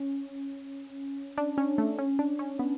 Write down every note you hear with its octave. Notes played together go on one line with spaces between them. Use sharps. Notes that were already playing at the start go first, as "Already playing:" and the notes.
Already playing: C#4
D4
C#4
A3
C#4
D4
C#4
B3